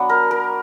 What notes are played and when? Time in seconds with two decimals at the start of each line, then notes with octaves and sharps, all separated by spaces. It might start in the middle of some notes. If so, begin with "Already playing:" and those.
Already playing: F#3 B3 D4
0.09 A#4
0.31 A#4